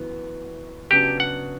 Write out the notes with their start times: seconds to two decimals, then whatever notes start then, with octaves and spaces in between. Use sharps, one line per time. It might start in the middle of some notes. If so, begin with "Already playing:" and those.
Already playing: F#2 E3 B3 F#4
0.90 C#3 F#3 B3 D4 G4
1.20 F#5